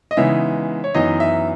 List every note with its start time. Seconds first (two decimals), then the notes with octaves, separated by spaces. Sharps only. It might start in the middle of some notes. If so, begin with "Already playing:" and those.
0.11 D#5
0.17 C#3 E3 G#3 B3 D#4 E5
0.84 C#5
0.94 F#2 E3 B3 D#4 D#5
1.20 E5